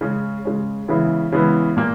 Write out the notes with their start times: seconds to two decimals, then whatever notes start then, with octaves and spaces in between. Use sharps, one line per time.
0.01 C#3 G#3 C#4
0.45 C#3 G#3 C#4
0.88 C#3 E3 G#3 B3 E4
1.32 C#3 E3 G#3 B3 E4
1.76 A#2 A#3